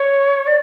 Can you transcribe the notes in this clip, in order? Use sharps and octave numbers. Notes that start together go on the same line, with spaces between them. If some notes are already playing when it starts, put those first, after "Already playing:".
Already playing: C#5
D5